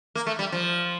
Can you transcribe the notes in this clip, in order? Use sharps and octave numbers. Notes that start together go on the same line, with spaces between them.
A#3
A3
G3
F3